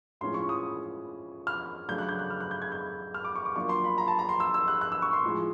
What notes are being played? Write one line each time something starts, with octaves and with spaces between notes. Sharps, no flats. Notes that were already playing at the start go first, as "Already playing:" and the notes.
A2 F3 G#3 C#4 C6
C#6
D#6
F6
C#3 F#3 A3 D4 G6
F#6
G6
F#6
F6
F#6
G6
G#6
G6
F6
D6
C#6
D6
F#3 A#3 D4 F4 C#6
C6
B5
A#5
A5
A#5
C6
E6
E6
F#6
F#6
E6
C#6
C6
A2 F3 G#3